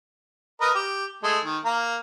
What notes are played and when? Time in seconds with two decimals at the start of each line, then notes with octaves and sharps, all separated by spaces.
0.61 A#4 B4 D#5
0.75 G4
1.23 G#3 A3
1.45 D#3
1.65 A#3 A#5